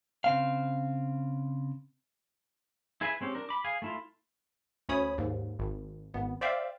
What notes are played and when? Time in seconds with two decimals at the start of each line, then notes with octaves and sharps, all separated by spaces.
0.24 C#3 C4 F5
3.01 E4 G#4 B4 E5 G#5
3.21 G#3 C4 C#4 G4
3.35 D4 A#4
3.49 B5 D6
3.64 G#4 F5 G#5
3.82 A3 E4 F4
4.89 D2 C#4 C#5 B5 D#6
5.18 D#2 G#2
5.59 G#1
6.14 G#1 B3
6.41 C5 D5 E5 F5 G5